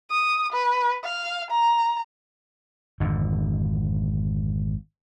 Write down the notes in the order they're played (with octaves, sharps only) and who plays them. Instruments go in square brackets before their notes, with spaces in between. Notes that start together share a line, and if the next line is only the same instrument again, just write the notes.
[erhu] D#6
B4
F5
A#5
[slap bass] G#1 F2 D3